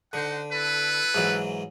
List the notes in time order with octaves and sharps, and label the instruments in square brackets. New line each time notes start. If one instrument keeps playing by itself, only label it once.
[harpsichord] D3 [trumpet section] D#4 C5 F#5
[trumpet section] E4 A4 B4
[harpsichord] G#2 E3 F#3